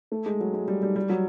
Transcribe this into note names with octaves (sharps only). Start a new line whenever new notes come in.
A3
G#3
F#3
G#3
G3
G3
G3
F#3